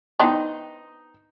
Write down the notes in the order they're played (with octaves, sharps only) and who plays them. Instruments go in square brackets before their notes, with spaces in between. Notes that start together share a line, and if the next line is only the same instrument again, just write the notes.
[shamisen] B3 C4 D4 [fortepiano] D#4 D#5